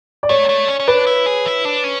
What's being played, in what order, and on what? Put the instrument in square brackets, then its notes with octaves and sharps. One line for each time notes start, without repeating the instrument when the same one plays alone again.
[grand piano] D5
[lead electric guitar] A3 [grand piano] C#5
[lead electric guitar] A3
C#4
C#4
[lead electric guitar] D4 [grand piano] B4
[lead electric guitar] E4
G#4
E4
D4
C#4